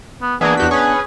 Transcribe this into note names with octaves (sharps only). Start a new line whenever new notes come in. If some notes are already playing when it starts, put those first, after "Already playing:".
B3
E3 A#3 B3 D4 G#4
E2 F#4 G4 B6
C#4 G#4 B4